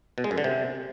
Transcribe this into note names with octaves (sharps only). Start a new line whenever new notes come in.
B2
G#3
F#2
D3
C3